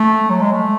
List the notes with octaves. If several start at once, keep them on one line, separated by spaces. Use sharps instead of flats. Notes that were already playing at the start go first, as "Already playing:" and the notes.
Already playing: A3
F#3
G#3
A3